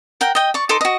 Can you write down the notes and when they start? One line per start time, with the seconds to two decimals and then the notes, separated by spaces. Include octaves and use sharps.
0.21 A#4 F#5 G5
0.35 D#5 G5
0.54 D5 C#6
0.69 D#4 A4 C6 D6
0.81 F#4 D#5